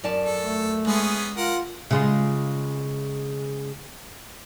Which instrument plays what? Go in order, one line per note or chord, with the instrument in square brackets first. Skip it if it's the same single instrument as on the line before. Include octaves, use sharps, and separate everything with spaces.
[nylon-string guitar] F#2 D5 A5
[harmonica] A4
[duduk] A3
[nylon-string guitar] G#3 [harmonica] B3 C#4 G#4
[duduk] F4 [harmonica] A#4 F#5
[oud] C#3 G#3 F4